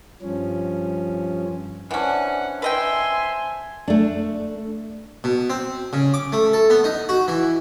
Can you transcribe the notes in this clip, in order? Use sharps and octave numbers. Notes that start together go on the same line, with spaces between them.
G2 F3 C#4
E3 C#4 D4 C5 F#5
B4 D#5 E5 G5 G#5 C6
A3 D4
B2
C4
C#3
D6
A3
A4
B3
D#4
F#4
E3